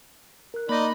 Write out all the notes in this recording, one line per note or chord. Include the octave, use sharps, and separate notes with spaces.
A#4 F#6
A#3 D#4 D5 B5 C6 A#6